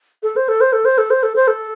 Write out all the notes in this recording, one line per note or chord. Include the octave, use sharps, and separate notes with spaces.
A4
C5
A4
C5
A4
C5
A4
C5
A4
C5
A4